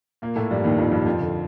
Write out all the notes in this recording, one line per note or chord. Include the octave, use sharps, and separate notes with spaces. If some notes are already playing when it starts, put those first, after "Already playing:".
A#2 A#3
A2 A3
G2 G3
D#2 D#3
F2 F3
G2 G3
F2 F3
D3